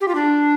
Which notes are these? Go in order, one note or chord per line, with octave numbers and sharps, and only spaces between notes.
G4
F4
D4